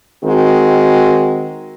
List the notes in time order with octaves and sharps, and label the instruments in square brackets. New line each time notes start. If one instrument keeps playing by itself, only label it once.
[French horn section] D#3 G#3 C4 F#4